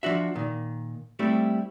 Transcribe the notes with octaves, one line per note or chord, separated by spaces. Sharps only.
F3 D4 F#4 E5
A#2 D#3
G3 A3 C4 E4 G4